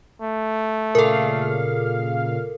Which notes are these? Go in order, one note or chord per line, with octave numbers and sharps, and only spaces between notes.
A3
A#2 C#3 A4 A#4 F5